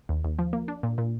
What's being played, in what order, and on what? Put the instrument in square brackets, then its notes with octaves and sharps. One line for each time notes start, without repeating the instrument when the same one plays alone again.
[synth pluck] D#2
D#2
F3
A#3
D4
A#2
A#2